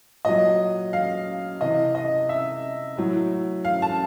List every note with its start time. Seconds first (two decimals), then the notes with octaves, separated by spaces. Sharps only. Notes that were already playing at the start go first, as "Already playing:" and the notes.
0.25 A#2 F#3 D#5
0.93 F5
1.60 C3 E3 D#5
1.95 D#5
2.29 E5
2.97 A2 F#3
3.65 F5
3.82 A5